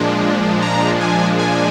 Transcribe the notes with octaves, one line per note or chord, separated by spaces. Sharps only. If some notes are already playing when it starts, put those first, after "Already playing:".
Already playing: A#2 F3 G#3 D4
A#5
G#5
G#5